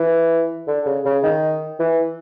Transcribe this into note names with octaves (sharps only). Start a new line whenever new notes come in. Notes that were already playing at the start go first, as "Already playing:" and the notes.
Already playing: E3
D3
C#3
C#3
D#3
E3